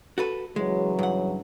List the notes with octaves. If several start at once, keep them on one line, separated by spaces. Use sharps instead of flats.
F#4 A4 B4
C#3 E3 F#3 G#3
G2 F#5